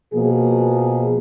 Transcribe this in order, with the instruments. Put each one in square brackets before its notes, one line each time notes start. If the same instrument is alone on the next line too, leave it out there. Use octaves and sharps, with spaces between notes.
[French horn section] B2 F3 A#3 G#4